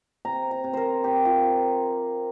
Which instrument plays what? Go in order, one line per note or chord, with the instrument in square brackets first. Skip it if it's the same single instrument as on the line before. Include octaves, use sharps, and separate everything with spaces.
[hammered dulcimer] C3 A#5
A#5
C3
A#4 C5
C4 G4
F4